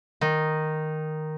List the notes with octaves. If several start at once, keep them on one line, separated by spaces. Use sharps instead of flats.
D#3